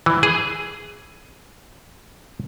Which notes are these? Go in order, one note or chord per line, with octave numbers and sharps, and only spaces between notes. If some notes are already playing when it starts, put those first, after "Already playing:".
E3
G#4